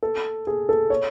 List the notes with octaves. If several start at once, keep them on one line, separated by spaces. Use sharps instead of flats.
A4
G#4
A4
C#5